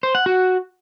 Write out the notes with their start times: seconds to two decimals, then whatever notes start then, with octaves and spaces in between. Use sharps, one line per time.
0.03 C5
0.15 F#5
0.26 F#4